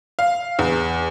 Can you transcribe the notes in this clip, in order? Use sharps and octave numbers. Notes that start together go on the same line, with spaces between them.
F5
E2